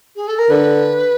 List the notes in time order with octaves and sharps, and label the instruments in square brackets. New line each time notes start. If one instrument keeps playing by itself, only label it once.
[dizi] G#4
A4
A#4
[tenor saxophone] D3 [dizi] B4